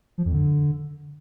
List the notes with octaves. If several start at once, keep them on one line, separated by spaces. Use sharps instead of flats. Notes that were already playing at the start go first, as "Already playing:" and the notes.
F3
F2
D3